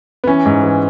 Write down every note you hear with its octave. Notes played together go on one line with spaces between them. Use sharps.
B3
E3 C#4
G#2
E3